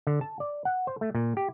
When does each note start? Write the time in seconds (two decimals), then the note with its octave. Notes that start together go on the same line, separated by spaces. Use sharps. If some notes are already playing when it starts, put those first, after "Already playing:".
0.07 D3
0.21 A5
0.40 D5
0.65 F#5
0.87 C5
1.01 A3
1.15 A#2
1.37 G4